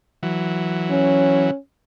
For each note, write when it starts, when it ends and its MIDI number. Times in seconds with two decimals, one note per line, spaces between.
0.23 1.51 52
0.23 1.51 54
0.91 1.57 61